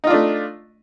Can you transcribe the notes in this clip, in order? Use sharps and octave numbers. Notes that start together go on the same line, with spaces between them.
A3 D4 D#4 F4